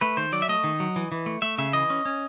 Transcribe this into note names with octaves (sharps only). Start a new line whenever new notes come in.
A3 B4
D#3 C5
F#3 D5
E5
A3 D#5
D#3
F#3
E3
E3
A3
A3 E5
C#3 E5
E3 D#5
C#4
C#4